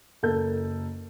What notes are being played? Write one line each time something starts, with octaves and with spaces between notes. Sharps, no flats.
F#1 A4 A#4 G6